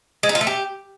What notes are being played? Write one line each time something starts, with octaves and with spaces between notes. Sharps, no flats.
G#3
D#4
F4
A3
G4